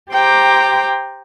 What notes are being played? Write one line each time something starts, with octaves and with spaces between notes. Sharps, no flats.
G4 C5 G5 A#5 D6